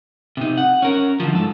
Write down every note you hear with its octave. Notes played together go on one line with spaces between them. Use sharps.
C3 D#4
F#5
C#4 A#4
D3 F3
G#2 A4